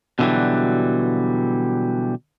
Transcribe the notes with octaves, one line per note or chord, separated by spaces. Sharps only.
B2 D3 E3 F#3 G3